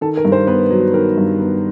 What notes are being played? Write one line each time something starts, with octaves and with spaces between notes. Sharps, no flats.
D#3 A4
A#4
G2
C5
B3 B4
F#3
D#3 A#4
G2
B3